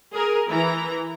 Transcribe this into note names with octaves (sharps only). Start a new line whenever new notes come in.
G#4 A#4
E3 E4 A#5